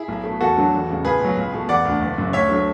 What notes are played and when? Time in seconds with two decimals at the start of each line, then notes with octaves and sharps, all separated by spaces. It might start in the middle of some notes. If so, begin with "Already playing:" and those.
Already playing: E4 G#4
0.08 B1
0.24 B2 A3
0.41 E2 F#4 A4
0.57 D3 F#3 A3
0.73 E1
0.89 E2 C#3 G#3
1.05 C#2 G#4 B4
1.20 B2 F#3
1.37 C#2
1.53 B2 A3
1.69 E1 D5 F#5
1.85 D2 D3
2.01 F#1
2.18 F#2 C#3
2.33 D2 C#5 E5
2.49 D3 F#3 A3